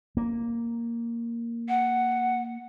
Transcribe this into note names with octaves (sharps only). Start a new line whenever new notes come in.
A#3
F#5